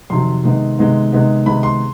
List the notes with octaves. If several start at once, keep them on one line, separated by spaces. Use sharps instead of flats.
F2 C3 D#3 F#3 C6
C3 D#3 G#3 B3 D#4
C3 D#3 G#3 B3 D#4
C3 D#3 G#3 B3 D#4
C3 D#3 G#3 B3 D#4 B5
C6